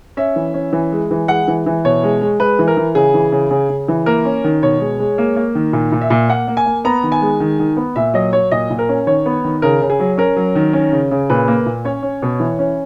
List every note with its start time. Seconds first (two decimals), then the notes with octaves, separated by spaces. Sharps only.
0.17 C#4 E5
0.36 E3
0.54 C#4
0.73 E3
0.92 G#3
1.11 E3
1.28 G#3 F#5
1.48 E3
1.66 E3
1.85 B2 C#5
2.03 G#3
2.21 G#3
2.40 G#3 B4
2.59 E3
2.68 A#4
2.77 E3
2.95 C#3 G#4
3.14 E3
3.32 C#3
3.50 C#3
3.69 C#3
3.88 E3
4.06 A#3 A#4
4.25 C#4
4.44 D#3
4.63 B2 C#5
4.80 G#3
4.99 G#3
5.18 A#3
5.36 A#3
5.55 D#3
5.73 A#2
5.92 A#2
6.01 E5
6.10 A#2
6.28 A#3 F#5
6.48 A#3
6.57 G#5
6.66 A#3
6.85 B3 A#5
7.03 D#3
7.12 G#5
7.21 G#3
7.40 D#3
7.59 D#3
7.77 B3
7.96 A#2 E5
8.14 F#3 D#5
8.33 F#3 C#5
8.51 A#2 D#5
8.70 A#2
8.79 A#4
8.89 C#4
9.07 D#3 C#5
9.26 B3
9.44 D#3
9.62 C#3 A#4
9.82 C#3
9.90 G#4
10.00 F#3
10.18 C#4 A#4
10.36 F#3
10.55 D#3
10.73 C#4
10.92 C#3
11.11 C#3
11.30 A#2 B4
11.48 A#3
11.66 A#2
11.85 C#4 C#5
12.03 C#4
12.22 B2
12.40 E3
12.59 C#4